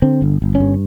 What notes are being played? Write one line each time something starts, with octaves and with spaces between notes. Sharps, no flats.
D3 C4
G1
G1
C#4
G2